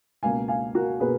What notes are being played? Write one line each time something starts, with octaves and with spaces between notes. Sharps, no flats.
C#2 B2 A#3 F5 G#5
F5 G#5
F#4 A#4
B2 A#3 G#4 B4